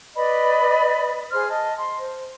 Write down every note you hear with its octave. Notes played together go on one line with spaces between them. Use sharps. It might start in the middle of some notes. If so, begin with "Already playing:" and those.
B4 D5 D#5 B5
G#4 C5 C6 F6
D#5 A5
C6
C5